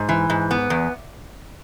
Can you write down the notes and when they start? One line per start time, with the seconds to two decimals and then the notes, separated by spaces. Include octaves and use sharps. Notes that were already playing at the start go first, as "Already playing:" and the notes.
Already playing: G#2
0.09 E3
0.30 G#2
0.51 B3
0.70 E2